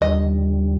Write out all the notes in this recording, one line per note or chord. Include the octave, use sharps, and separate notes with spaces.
D#2 D3 G3 D#5